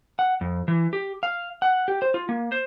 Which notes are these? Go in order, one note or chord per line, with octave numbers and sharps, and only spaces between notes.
F#5
F2
E3
G4
F5
F#5
G4
C5
F4
A#3
C5